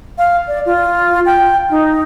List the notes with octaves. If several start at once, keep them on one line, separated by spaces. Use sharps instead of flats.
F5
D5
F4
G5
D#4